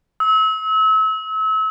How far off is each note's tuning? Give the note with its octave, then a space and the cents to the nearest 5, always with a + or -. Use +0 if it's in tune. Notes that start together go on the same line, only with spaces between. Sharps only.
E6 -35